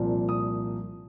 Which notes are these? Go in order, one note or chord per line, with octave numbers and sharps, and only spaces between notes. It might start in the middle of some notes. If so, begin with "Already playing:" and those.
Already playing: C2 A#2 F3
D#6